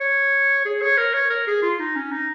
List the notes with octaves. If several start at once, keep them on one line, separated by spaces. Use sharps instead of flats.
C#5
G#4
C#5
A#4
C#5
A#4
G#4
F4
D#4
C#4
D#4